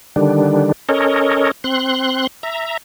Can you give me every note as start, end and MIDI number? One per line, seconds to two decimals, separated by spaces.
0.16 0.72 50
0.16 0.72 51
0.16 0.72 55
0.16 0.72 62
0.89 1.51 61
0.89 1.51 69
0.89 1.51 70
0.89 1.51 73
0.89 1.51 75
1.64 2.27 60
1.64 2.27 84
1.64 2.27 90
2.43 2.77 76
2.43 2.77 82